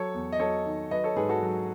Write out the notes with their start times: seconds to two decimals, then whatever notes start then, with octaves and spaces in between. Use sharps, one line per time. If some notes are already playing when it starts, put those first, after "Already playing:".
Already playing: F#3 A4 C#5
0.14 E2
0.32 D#5
0.39 F#3 A4 C#5
0.66 D#3
0.91 F#3 B4 D#5
1.04 A4 C#5
1.16 G#2 G#4 B4
1.29 F#4 A4
1.43 F#3